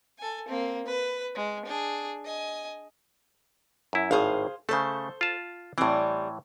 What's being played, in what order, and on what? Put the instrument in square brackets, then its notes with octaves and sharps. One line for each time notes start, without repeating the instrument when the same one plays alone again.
[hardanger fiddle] A4 G#5
A#3 C4
B4
G#3
D4 G#4
D#5 G#5
[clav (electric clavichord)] F#2 E4
[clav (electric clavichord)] G#1 A2 [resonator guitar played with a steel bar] G#4 C5 F5
[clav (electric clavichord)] C#3 A3 [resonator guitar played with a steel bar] A4 C5
[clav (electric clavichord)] F4 A5
[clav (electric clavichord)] A2 E3 [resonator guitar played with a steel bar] G3 C4